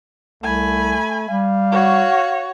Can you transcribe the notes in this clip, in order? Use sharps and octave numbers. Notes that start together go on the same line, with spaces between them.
C2 A3 G#5 B5
G3 F5
F#4 C#5